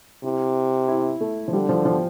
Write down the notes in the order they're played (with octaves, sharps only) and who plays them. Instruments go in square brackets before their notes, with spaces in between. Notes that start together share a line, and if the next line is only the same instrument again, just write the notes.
[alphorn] C3 [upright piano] E4
[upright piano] E4
A3
F3
[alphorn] D3 [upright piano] G3
[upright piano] F3
F3